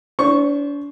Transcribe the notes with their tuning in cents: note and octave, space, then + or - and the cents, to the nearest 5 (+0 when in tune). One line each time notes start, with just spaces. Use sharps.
D4 -40 C5 +0 C#6 +0